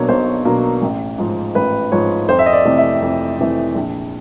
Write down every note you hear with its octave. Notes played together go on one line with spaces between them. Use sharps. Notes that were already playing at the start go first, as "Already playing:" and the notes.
Already playing: B2 F#3 A#3 D4 C#5
B1 C5
B2 F#3 A#3 D4
A1
G#2 F3
A1 B4
G#2 F3 C#5
F2 C5
E5
D#5
D5
C3 E3 A3
E5
F2
C3 E3 A3
A#1